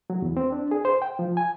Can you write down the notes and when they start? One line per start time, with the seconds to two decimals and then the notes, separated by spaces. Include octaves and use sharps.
0.10 F#3
0.22 E2
0.37 C4
0.52 D4
0.71 G#4
0.85 C5
1.02 G5
1.19 F3
1.37 G#5